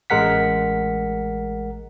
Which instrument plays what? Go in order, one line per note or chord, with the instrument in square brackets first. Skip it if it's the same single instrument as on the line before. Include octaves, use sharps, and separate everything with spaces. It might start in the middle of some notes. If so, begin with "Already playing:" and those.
[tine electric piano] A1 G#3 A#4 F#5 B6